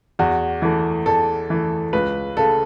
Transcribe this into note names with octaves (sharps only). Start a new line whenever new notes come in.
E2 F#4
E3 A3
E2 A4
E3 A3
C#2 B4
C#3 A3 A4